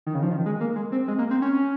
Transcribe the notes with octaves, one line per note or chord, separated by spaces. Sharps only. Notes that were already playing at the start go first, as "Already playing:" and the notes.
D#3
C#3
F3
D#3
G#3
A#3
G#3
C4
G#3
A#3
C4
C#4